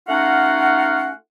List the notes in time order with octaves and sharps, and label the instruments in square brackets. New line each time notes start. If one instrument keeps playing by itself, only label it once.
[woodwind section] A3 C#4 D#4 F4 F#4 F#5